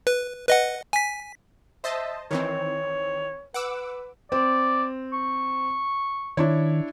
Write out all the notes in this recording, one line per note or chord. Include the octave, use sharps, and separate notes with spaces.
B4
B4 D#5 F#5
G#5 B6
C5 D#5 E5 A5
D#3 E3 C4 C#5
B4 F#5 D6 E6
C4 D5
C#6
D#3 D4 E4 C#5